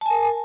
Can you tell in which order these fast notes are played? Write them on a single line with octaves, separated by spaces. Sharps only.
A5 G#5 A#4